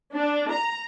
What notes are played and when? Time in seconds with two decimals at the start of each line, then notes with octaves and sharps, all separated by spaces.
0.13 D4
0.50 A#5